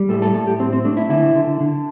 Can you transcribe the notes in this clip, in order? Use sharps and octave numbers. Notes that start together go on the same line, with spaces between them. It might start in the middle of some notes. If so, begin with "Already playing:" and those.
Already playing: G3
A2 A4
A4
A2 A4
G4
C4
C4
A3 D4
E4
D3 E4
D3
D3